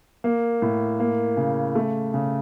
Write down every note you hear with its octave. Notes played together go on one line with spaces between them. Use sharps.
A#3
A2
A#3
C#3
A3
C#3